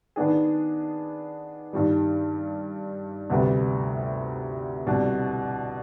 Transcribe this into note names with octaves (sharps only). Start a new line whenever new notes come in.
D#3 B3 D4 G#4
G2 D#3 G3
D2 C3 G3 B3
C2 B2 G3 D4